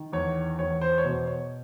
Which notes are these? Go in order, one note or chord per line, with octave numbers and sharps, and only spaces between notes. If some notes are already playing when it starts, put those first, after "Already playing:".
Already playing: D#3
E2 C#5
E2 C#5
C5
C#5
B2 C5
C#5